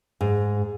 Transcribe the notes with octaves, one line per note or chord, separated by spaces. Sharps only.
G#2